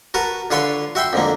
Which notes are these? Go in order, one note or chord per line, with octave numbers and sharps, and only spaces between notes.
F#4 A#4 B4 A5
D3 F4 B4 C#5 B5 C6
F#4 E5 G5 B5 C6
F2 D3 A#3